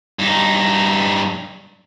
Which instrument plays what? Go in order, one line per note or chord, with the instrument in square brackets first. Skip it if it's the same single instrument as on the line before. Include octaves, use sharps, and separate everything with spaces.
[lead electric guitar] G2 D#4